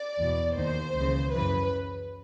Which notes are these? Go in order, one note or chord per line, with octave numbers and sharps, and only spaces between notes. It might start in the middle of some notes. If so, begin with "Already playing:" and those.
Already playing: D5
E2 B2
D#2 D#3 C5
C#2 C#3 E3
F#2 C#3 E3 B4